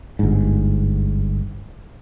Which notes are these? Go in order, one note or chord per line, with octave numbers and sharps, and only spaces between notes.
G1 G#2